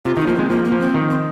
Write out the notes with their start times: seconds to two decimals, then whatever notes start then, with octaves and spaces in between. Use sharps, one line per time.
0.05 C3 F4
0.16 D#3 F4
0.20 D#4
0.27 F3 A#3
0.35 G#3 C4
0.50 F3 A#3
0.65 A#3
0.72 F3
0.80 C4
0.94 D#3
1.10 C4